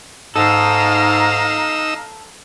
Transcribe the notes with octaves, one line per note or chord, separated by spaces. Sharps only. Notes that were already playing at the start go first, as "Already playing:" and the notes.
G#2 D#4 A4 F5 A#5 E6